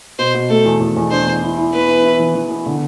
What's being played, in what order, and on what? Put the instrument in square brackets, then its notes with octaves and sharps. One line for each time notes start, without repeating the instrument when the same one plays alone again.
[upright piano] B2 [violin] C5
[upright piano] B2
[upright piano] A3 [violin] A4
[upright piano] E2
E2
E2
[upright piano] D4 [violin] C5
[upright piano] E2
E4
E4
[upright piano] B3 [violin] B4
[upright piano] E4
E4
E3
E3
B3
D3